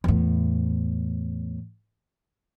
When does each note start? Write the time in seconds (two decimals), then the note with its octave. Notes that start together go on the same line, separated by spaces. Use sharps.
0.04 E2 A2